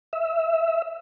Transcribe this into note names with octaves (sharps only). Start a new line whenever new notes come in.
E5